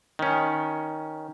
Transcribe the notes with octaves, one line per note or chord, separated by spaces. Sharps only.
D#3 C#4